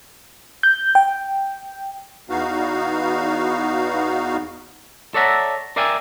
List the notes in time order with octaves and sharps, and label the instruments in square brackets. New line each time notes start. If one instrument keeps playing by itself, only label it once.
[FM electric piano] G6
G5
[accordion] E2 B3 D#4 F#4 F5
[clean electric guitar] A4 C#5 D5 E5 F#5 A#5
A#4 D5 E5 F5 G5 G#5